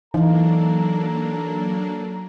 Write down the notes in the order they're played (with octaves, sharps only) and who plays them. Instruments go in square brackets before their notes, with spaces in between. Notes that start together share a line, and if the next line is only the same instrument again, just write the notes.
[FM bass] E3 [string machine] F#3 A#3 D4 [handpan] D#4 F5 [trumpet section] A4 A#5